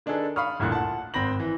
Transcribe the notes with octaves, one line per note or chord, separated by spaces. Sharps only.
D#3 D4 D#4 G#4 A4 B4
F5 B5 C#6 D#6 F6
A1 D2 G2 A#2 F#6
F#5 A5
G#1 C4 B5 A#6 F#7
E3